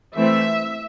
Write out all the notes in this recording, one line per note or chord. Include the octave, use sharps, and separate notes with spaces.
E3 A3 C4 E5